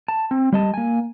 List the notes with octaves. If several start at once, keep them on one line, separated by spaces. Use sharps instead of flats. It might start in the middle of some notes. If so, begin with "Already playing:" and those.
A5
C4
G3 D#5 A5
A#3 G#5